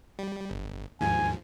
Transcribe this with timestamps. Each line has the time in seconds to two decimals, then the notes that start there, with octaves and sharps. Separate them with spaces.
0.19 G3
0.51 G1
1.01 D#2 G#2 F3 G#5